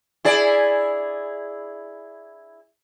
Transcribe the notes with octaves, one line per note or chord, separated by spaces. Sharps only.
E4 G#4 D5